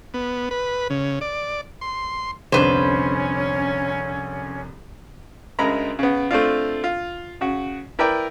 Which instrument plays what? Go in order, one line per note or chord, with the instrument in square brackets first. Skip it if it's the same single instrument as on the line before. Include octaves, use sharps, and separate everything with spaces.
[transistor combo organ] B3
B4
C#3
D5
C6
[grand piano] C2 F2 D3 [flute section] C#4 [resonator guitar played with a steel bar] B4 C5
[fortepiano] D2 C#3 G#3 A#4 A#5 B5
C#3 B3
A3 C4 D4 F4
F4
C#3 F#4
E4 A#4 B4 D5 G5